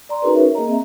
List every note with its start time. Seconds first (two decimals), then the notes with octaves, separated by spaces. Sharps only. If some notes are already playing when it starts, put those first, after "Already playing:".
0.09 D5 A#5 C6
0.22 C#4 D#4 F#4 G#4 A#4 B4
0.35 A#4 C#5 E5
0.55 A#3 G#4 D#5 A#5
0.68 C4 E5